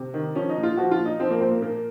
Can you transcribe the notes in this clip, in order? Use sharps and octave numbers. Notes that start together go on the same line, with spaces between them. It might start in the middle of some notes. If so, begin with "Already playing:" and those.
Already playing: C3
D#3
F3 C#4
D#4
A#2
F4
F3 F#4
F4
A#2
D#4
F3 C4
A#3
A#2 C4
A#3
A#2 A#3